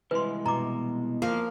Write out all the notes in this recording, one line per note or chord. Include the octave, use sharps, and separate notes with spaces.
C2 E3 G#3 B4 C6
B2 A#5 D6
F3 A#3 A#4 F5